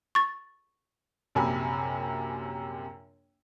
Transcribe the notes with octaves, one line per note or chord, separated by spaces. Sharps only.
C#6 A6
A#1 F#2 C3 G#5 B5